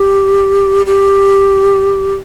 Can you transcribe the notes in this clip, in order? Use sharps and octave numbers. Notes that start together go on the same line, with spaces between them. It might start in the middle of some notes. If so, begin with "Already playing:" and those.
Already playing: G4
G4